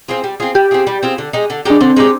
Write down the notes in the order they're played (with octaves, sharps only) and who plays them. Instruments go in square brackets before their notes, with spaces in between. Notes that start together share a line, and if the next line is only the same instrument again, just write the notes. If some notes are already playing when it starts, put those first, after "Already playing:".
[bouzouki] C4 F4 G#4
G3
C4 F4 G#4
[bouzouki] G3 [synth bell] G4
[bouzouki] C4 F4 G#4
G3
C4 F4 G#4
D3
G#3 D#4 G4
D3
[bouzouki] G#3 D#4 G4 [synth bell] D4
[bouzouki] D3 [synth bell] C4
[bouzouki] G#3 D#4 G4